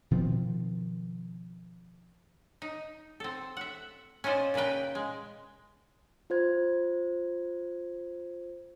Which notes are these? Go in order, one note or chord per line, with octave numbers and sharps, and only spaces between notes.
B2 D#3 F3 C4
D#4
C4 A4
E5 F#5
C#4 D#4 F4 C5 D5
A#2 C#3 A#4 B4 G5
G#3
F4 C5 G#6